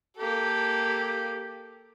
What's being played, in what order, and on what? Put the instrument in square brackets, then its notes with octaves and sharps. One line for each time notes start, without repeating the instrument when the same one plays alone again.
[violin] A#3 A4 [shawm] G4